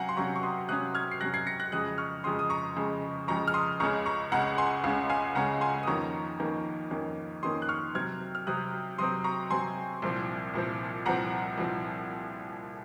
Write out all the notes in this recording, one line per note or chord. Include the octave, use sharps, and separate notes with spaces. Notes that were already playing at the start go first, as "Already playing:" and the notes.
Already playing: C3 F#3 C#4 F5 F#5 G#5 A#5
C6
C3 F#3 C#4 A#5 C#6
C#6
C6 D#6
C3 F#3 C#4 D#6 F#6
F6 G#6
C7
C3 F#3 C#4 F#6 A#6
G#6 C7
A#6 C#7
F#6 A#6
F2 C#3 G#3 D#6 F#6
C#6 F6
F2 C#3 G#3 C6 D#6
D#6
A#5 C#6
F2 C#3 G#3
F2 C#3 G#3 A#5 C#6
F6
C6 D#6
C#2 C#3 G#3 C#4 A#5 C#6
A#5 C#6
C#2 C#3 G#3 C#4 F#5 A#5
G#5 C6
C#2 C#3 G#3 C#4 F5
F5 G#5
C#2 C#3 G#3 C#4 F#5 A#5
G#5 C6
D#6
F2 D#3 A#3 C#4 A#5 C#6
F2 D#3 A#3 C#4
F2 D#3 A#3 C#4
F2 D#3 A#3 C#4 C6 D#6
F#6
C#6 F6
C3 F#3 C4 F6 G#6
F6
C3 F#3 C4 D#6 F#6
C3 F#3 C4 C6 D#6
A#5 C#6
C3 F#3 C4 G#5 C6
C2 A#2 F3 C4
C2 A#2 F3 C4
C2 A#2 F3 C4 F#5 A#5
C2 A#2 F3 C4